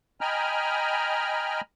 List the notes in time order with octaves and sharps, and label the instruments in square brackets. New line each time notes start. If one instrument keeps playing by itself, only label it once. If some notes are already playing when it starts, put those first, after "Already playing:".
[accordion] D#5 G5 G#5 A#5 B5 F6